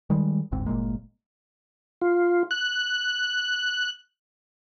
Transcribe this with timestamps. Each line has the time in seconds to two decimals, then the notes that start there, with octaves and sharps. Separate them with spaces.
0.10 D#3 G3 G#3
0.52 G1 D2 G#2 C4
0.66 G1 A#2 G#3 A#3
2.02 F4
2.51 F#6